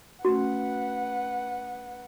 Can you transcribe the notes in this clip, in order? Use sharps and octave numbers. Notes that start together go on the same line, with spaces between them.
A3 C#4 F#4 B4 F#5